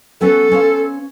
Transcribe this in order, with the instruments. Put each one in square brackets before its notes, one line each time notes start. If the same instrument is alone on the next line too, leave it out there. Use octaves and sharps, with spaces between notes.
[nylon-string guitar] F#3 B3 C#4 [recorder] A4
[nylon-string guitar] C#4 C5 F5